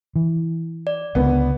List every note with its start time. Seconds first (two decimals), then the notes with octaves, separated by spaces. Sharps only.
0.16 E3
0.87 D5
1.15 C#2 D3 B3